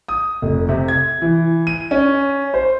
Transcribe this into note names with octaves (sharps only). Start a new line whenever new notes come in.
D#6
F1
C3
G#6
E3
D#7
C#4
C5